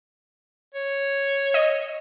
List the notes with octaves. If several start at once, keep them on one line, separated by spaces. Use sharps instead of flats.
C#5
D#5